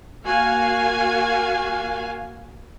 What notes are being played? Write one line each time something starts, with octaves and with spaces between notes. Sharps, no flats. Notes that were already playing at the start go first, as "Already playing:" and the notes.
A#3 F#4 F5 G#5